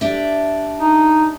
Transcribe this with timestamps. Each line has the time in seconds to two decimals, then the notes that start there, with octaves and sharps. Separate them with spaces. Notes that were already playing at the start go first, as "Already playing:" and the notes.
0.01 D4 G4 E5
0.80 D#4